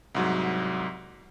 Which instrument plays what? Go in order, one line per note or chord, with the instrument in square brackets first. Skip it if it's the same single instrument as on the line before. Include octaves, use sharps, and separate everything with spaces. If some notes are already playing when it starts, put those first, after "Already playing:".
[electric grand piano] C2 G#2 F#3